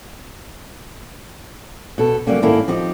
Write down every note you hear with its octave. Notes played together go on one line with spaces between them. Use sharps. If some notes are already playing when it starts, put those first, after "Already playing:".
B2 A4
D3 F#3 G3 A#3 C#4
G#2 D#3 A#3 C#4 E4 A4
F3 C4 D#4 G4